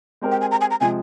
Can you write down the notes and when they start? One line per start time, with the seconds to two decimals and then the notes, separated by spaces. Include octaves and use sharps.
0.21 G#3 C4 G4 A#4
0.32 G5
0.41 G#5
0.51 A#5
0.61 G#5
0.71 A#5
0.81 C3 F3 G#3 G#5